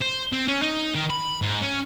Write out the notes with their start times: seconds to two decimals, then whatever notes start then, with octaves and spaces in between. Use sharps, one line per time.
0.01 C5
0.33 C4
0.48 C#4
0.62 D#4
0.95 D#3
1.10 B5
1.42 G#2
1.61 C#4